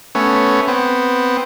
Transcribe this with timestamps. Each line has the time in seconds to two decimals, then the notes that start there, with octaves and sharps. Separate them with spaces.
0.15 A3 B3 C#4
0.67 B3 C4